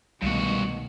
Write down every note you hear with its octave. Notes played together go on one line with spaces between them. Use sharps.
C2 G2 B2 D#3 G#3 A3 F#4